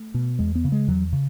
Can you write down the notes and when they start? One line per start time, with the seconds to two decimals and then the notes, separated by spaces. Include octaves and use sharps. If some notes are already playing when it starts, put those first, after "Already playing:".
Already playing: A3
0.14 B2
0.39 E2 G#3
0.55 B3
0.64 C#3
0.72 G#3
0.88 E2 F#3
1.13 C#3